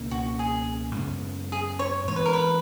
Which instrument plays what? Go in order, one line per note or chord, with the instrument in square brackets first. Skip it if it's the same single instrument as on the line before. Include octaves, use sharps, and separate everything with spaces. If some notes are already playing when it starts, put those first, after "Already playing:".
Already playing: [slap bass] C#2 B2 A#3 C#4
[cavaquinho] F#4
G#4
[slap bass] F#2 C#3 G#3 B3
[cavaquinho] G#4
C#5
[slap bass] G#2 E3 G#3 B3 [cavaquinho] C#5
[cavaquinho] B4
A#4
B4